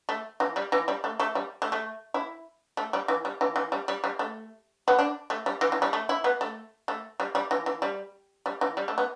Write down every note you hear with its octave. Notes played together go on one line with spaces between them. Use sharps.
A3
E3
G3
E3
G3
A3
A3
G3
A3
A3
E4
A3
G3
E3
G3
E3
E3
G3
G3
G3
A3
B3
D4
A3
G3
E3
E3
G3
A3
E4
B3
A3
A3
G3
G3
E3
E3
G3
G3
E3
G3
A3
B3